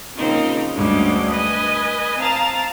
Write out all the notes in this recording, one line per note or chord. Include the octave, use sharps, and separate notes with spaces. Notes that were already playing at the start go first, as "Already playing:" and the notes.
C#3 F3 A#3 C4 D#4
D2 G2 D3 G3 G#3 C#4
B4 D#5 G#5
C4 F5 A5 A#5 A6